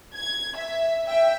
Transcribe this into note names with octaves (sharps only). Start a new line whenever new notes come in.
G#6
E5
E5 G5